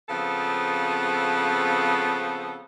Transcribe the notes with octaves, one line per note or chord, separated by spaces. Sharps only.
C#3 F3 B3 C4 A4